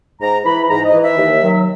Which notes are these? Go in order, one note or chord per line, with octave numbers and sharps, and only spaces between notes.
G#2 A#5
E3 B5
G#2 A#5
D#5
E3
E5
D#2
D#3 F#3